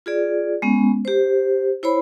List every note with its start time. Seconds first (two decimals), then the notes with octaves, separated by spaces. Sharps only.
0.06 F4 G#4 D5
0.62 G#3 B3 C#4
1.05 G4 C5
1.83 E4 C5 C#5 B5